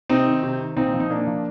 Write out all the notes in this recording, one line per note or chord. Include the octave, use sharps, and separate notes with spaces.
C3 C4 D#4
D#3
C3
D#3
A#2 C4 D#4
F3
D#4
A#2 A#3 D4
F3